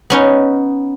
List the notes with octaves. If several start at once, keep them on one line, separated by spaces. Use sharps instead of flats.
B3 C#4 D#4